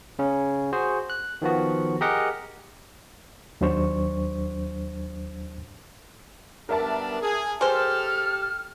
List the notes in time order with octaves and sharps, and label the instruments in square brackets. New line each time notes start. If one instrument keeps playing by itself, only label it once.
[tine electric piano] C#3 C#4
F#4 G#4 C5
F#6
D#3 F3 B3 F#4
G4 G#4 A#4 D#5 F#5
[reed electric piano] D#2 F#3 D4 C5 C#6
[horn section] G3 B3 D4 [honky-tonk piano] A#4 E5 A5
[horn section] G#4
[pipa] G#3 C5 [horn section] G4 A4 [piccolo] F6